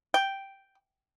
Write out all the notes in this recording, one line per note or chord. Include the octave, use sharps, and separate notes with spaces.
G5